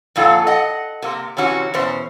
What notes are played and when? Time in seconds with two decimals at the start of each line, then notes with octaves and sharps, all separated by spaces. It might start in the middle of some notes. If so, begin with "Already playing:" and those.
0.16 F2 A#2 F4 A4 F#5
0.47 D#5 F#5
1.02 C3 A#3
1.37 C3 E3 C#4 F#4
1.74 E2 B2 C#4 C5